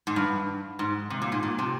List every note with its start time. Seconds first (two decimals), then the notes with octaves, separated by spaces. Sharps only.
0.07 G#2
0.16 G2
0.79 G#2
1.10 C3
1.22 A#2
1.32 G#2
1.43 A#2
1.58 C3